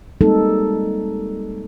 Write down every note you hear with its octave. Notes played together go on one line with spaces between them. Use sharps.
G3 G#3 A#3 C4 D#4 A4